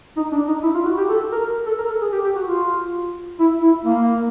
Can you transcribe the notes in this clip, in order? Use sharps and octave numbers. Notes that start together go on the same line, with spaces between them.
D#4
D4
D#4
E4
F4
F#4
G4
A4
A#4
A4
A#4
A4
G#4
G4
G4
F#4
F4
E4
E4
A#3